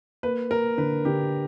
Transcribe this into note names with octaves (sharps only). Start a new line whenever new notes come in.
A#3 B4
A#3 A#4
D3 B4
D3 G4